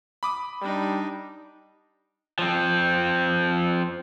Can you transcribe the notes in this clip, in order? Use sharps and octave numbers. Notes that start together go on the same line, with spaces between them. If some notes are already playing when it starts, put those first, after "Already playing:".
B5 D6 D#6
G3 D4 D#4
F3 C4